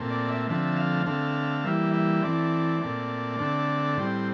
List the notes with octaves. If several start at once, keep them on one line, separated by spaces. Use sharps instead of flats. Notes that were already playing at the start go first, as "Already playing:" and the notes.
Already playing: A#2 A3 C4
D5
E5
D3 F3 A3 C4 E5
F5
D3 A3 C4 F5
E3 G3 A#3 E5
E5
E3 A3 C4 D5
A#2 A3 C4
D3 A3 C4
A2 G3 C4 C5